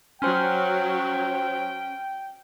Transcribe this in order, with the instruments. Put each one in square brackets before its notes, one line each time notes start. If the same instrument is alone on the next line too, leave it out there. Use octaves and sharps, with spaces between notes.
[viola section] F#3 [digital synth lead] C#4 [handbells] C5 C6 F6 [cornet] G5